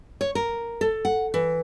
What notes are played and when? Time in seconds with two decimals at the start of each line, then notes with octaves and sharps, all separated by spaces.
0.21 C#5
0.35 A#4
0.81 A4
1.05 F#5
1.34 E3